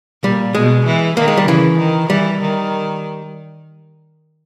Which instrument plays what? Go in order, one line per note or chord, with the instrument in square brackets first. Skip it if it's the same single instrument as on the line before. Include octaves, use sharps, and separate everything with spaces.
[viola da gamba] A#2 [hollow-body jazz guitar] G3
[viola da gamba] B2 [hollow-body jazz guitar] G#3
[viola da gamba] E3
[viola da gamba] D#3 [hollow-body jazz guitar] A#3
[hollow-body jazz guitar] G#3
G3
[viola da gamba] C#3 [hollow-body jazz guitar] E3
[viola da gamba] D#3
[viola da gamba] E3 [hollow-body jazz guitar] G3
[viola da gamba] D#3